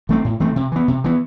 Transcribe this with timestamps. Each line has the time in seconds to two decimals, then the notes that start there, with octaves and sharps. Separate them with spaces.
0.09 E3 A3 C4
0.25 A2
0.40 E3 A3 C4
0.56 C3
0.72 E3 B3
0.88 C3
1.04 E3 B3